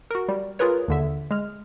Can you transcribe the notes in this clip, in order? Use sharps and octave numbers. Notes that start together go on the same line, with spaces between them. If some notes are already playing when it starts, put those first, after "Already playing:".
F#4 A#4
G3
F4 G#4 A#4 B4 C#5
D#2 D3 E5
G#3 F6